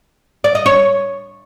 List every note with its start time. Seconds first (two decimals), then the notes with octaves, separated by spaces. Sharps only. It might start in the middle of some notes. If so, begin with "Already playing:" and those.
0.44 D5
0.55 D#5
0.66 C#5